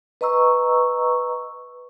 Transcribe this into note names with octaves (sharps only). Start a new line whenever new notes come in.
B4 D#5 A#5 C#6 E6